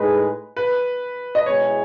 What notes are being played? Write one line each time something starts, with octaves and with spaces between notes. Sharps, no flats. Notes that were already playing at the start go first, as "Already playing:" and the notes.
Already playing: A2 G#3 D#4 G#4 B4
B4
D#5
B2 G#3 B3 E4 G#4 C#5